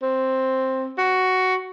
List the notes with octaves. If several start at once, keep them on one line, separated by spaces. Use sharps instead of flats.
C4
F#4